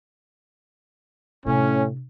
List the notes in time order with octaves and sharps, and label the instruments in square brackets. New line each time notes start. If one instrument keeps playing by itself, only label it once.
[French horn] A2 [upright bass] C3 D4 [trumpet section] C#4